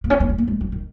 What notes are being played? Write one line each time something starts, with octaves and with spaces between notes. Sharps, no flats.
A#3
C#4
A#3
G#3
A#3
G#3
F#3
D#3